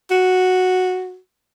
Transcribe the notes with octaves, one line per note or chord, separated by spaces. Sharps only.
F#4